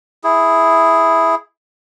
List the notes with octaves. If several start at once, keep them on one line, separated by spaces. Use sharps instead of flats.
E4 G#4